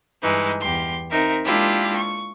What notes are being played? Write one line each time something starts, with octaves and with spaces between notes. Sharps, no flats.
G2 E3 G#3 D#4
E2 G4 C6
C4 D#4 A#4 E5
G#3 A#3 D4 E4 F4 G4
C#6